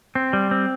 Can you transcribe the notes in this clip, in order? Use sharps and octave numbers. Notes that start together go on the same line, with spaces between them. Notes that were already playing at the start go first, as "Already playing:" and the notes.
C4
G3
C4